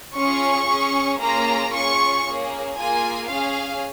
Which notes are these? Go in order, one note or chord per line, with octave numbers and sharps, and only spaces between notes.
C#4 F4 G#4 C#6
C#4 G#4
A#3 C#4 F4 G#4 A#5
C#4 F4 G#4 C#6
A#3 C#4 G#4
A#3 F4 G#4 G#5
C#4 G#4 F5